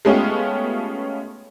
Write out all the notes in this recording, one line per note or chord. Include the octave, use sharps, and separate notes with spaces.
G#3 A3 B3 C#4 F4 G4